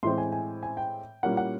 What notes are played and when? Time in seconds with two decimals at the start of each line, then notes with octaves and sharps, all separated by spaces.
0.03 A2 E3 G#3 C4 C6
0.18 G#5
0.32 G#5
0.63 G#5
0.77 G5
1.23 A#2 G3 A#3 C#4 E4 F#5
1.37 F#5